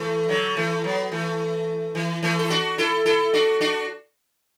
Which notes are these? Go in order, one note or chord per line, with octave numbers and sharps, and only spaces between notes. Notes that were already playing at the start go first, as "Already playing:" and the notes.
Already playing: E3 A3
D3 F#3
E3 A3
F#3 B3
E3 A3
E3
E3 A3
A4
D4 F#4
E4 A4
E4 A4
D4 F#4
D4 F#4